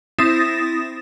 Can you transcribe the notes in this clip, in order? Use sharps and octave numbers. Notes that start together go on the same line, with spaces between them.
C4 E4 D#6 A6 A#6 E7